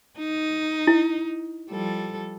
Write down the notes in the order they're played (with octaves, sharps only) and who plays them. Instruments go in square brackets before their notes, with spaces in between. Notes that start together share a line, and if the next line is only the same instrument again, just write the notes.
[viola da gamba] D#4
[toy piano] E4
[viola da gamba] F3 G3 A4